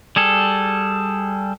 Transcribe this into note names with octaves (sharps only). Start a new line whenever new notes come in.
G3 G#4 A4